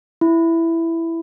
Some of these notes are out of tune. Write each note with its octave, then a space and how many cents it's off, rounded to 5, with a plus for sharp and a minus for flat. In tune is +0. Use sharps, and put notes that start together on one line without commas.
E4 +5